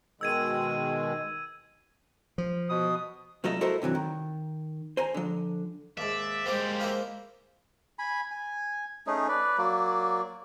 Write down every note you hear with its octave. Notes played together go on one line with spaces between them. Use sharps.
B2 D#3 G#3 E6 G#6 D#7
F3
B2 D#6
C2 F#3 A3 F4 A4 D#5
E4 F#4 A4 A#4 C5 D#5
G2 C3 E3 F#3
D#3
C5 G#5 A#5
D3 F3
D#2 G#2 D5 E5
G3 G#3 A#3 G4 A#4 C5
A#3 E4 F4
G#5 B5
G#5
A3 C#4 D#4 G#4
B4 D5
F#3 A#3 D5